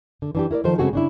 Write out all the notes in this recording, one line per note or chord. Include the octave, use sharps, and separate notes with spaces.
D3
E3 D4 G4
E4 A#4 C#5 D5
D#3 F3 A4 C5
C#3 G#3 C4 F#4 G#4 A4
C#3 D4 E4